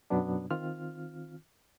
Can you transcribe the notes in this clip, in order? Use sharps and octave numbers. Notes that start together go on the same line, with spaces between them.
F#2 B2 F#3 B3 D4
D#3 C4 F4 F6